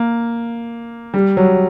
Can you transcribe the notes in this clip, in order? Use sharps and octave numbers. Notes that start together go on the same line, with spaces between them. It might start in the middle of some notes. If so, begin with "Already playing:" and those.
Already playing: A#3
G3
F#3